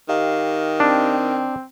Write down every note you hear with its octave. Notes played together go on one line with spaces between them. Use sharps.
D#3 G4 D#5 F5
C4 D4